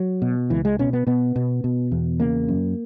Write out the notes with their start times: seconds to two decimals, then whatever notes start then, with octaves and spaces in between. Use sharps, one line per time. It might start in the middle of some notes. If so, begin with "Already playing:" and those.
Already playing: F#3
0.22 B2
0.50 C#2 E3
0.65 G#3
0.79 B2 C#4
0.93 B3
1.07 B2 B3
1.36 B2
1.64 B2
1.92 E2
2.20 C#3 A#3
2.48 F#2